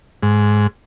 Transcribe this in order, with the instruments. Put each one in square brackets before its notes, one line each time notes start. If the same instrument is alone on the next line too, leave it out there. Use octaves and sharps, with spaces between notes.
[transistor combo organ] G#2